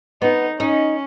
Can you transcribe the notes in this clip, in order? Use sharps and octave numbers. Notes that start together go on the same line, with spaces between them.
B3 D#4
C#4 D#4